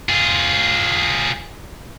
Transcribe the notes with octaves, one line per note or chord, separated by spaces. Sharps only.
F4 G#4